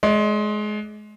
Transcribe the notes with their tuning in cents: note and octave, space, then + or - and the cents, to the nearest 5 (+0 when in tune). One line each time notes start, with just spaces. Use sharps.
G#3 +25 D5 +0